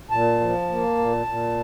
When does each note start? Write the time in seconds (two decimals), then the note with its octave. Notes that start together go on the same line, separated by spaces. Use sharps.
0.11 A#2 A5
0.40 F3
0.69 A#3
0.98 A#2
1.26 A#2